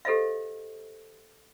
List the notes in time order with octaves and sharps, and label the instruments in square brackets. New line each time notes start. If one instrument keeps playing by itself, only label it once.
[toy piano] G4 A4 C5 D#5 F5